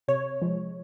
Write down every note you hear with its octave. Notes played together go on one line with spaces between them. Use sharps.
C3 C#5
F3 G#3